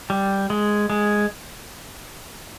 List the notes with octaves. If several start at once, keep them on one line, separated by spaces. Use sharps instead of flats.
G3
G#3
G#3